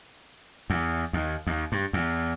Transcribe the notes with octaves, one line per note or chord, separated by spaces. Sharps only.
E2
D#2
D#2
G2
E2